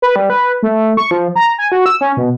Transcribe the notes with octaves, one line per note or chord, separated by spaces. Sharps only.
B4
G3
B4
A3
C#6
F3
A#5
G#5
F#4
E6
C#4
B2